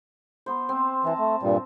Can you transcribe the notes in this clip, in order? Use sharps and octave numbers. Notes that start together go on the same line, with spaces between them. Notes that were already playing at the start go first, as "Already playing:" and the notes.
B3 C5
C4
E3 A5 A#5
A3
G2 A#2 G3